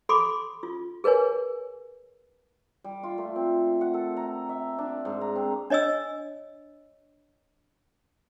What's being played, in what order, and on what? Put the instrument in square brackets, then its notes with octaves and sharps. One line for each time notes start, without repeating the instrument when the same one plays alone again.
[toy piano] A4 B5 C6 D6
F4
G#4 A#4 B4 C#5 G#5
[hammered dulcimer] G3
F4
A3
C4
F#5
A4
A#5
E5
D4
G#2
A#5
C4
[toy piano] D4 C#5 D#5 G#5 E6